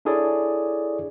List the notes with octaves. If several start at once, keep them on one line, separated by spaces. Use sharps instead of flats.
D4 E4 G#4 A4 C#5 D5